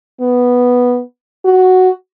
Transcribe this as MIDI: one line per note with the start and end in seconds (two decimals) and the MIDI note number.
0.21 1.02 59
1.45 1.90 66